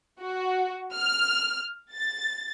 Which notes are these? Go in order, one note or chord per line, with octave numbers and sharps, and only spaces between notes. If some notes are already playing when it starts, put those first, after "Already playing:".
F#4
F6
A6